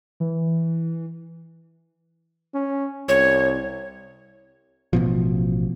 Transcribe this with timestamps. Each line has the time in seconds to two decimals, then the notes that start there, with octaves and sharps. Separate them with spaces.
0.20 E3
2.55 C#4
3.09 C2 C#5
4.93 A1 B2 F3